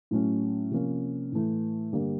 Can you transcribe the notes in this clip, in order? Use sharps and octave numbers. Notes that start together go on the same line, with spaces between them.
A2 F#3 A3 C#4
C3 F3 A#3 C#4
A2 E3 A3
G2 D3 G3 A#3